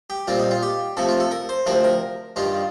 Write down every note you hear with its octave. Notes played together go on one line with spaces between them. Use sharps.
G4
A#2 G3 C4 F4
D#4
F4
G4
F2 C3 F3 A3 A4
F4
A4
A#4
C5
D2 C3 F3 C4 A#4
A#4
G2 D#3 G3 F4